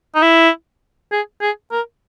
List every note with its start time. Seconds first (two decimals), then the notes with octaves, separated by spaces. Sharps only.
0.15 D#4
0.22 E4
1.12 G#4
1.41 G#4
1.72 A#4